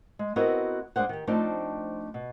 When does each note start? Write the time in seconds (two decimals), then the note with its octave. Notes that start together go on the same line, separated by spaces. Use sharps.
0.19 G#3
0.36 B3 C4 E4 F#4 A#4 D#5
0.96 G#3 D4 G#4 C5 F#5
1.09 D#3 G4
1.27 F3 A3 C4 D4 D#4
2.14 B2